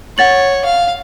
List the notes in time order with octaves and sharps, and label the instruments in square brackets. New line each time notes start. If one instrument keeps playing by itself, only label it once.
[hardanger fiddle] C#5 [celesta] F#5 A6 F#7
[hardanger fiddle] F5